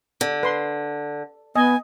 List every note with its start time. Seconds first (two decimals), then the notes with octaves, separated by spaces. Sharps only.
0.21 D3
0.43 B4 C6
1.56 B3 D#5 G#5